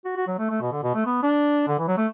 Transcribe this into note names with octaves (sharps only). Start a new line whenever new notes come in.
F#4
F#4
F#3
A3
A3
B2
D3
B2
A3
B3
D4
D3
E3
F#3
A3